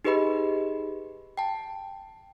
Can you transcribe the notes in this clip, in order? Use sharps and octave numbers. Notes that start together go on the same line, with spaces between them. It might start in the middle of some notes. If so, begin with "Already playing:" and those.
D#4 G4 G#4 B4 D#5 B5
G5 A5